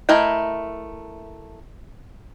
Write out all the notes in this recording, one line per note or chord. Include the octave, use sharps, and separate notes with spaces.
A3 E4 A#4 D#5 G5